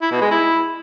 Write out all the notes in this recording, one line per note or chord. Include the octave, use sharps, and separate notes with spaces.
E4
B2
G#3
E4